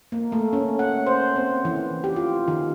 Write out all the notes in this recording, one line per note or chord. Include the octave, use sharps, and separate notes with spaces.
A#3
A3
C#4
F#5
C5
C4
E3
G4
F4
D#3